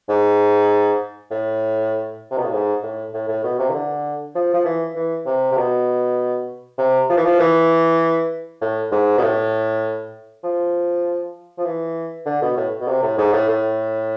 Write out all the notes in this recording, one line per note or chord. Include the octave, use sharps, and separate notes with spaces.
G#2
A2
C3
B2
A2
G#2
A2
A2
A2
B2
C3
E3
D3
F3
F3
E3
E3
C3
C3
B2
C3
F3
E3
F3
E3
A2
G#2
B2
A2
F3
F3
E3
D3
B2
A2
B2
C3
A2
G#2
A2
A2